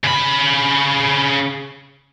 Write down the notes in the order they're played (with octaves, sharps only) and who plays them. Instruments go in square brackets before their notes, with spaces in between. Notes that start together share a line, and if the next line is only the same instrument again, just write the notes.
[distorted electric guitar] C#3 B5